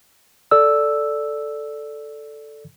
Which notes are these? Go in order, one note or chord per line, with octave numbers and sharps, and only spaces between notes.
A4 D5 E6